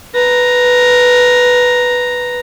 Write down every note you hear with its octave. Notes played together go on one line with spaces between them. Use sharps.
B4 A#5